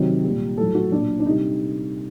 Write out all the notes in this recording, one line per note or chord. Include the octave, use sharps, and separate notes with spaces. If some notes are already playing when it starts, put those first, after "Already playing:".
Already playing: C3 D#3 F#3
A#2 G3
A2 F#3 A4
F#4
A#2 F#3 D4
D4
C3 G3 D#4